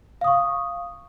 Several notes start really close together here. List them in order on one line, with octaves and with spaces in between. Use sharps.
F5 D#6 C#6